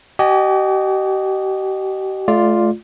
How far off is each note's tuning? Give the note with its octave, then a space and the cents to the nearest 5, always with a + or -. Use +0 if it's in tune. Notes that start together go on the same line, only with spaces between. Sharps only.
G4 -40 D#5 -20 G#5 +0
A3 -35 F4 +0 D5 +0